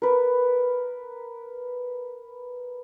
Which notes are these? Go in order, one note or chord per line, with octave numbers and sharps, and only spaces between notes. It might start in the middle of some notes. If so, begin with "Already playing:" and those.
A#4 B4